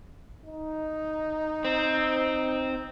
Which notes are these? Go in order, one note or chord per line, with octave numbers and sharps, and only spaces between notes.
D#4
C4